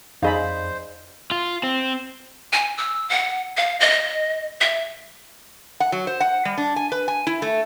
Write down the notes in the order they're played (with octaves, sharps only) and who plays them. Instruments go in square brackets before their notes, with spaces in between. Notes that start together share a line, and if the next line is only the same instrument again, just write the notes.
[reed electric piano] F2 [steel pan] D#4 G#4 B5 [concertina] C5 [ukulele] D5 D#5 F5
[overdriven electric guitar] F4
C4
[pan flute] G#5
E6
F#5
F5
D#5
E5
[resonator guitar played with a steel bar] F#5
F#3
C5
F#5
G3
D4
G#5
B4
G#5
E4
A3